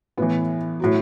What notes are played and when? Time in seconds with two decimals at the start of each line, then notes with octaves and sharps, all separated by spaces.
0.18 A2 E3 B3
0.80 A2 F#3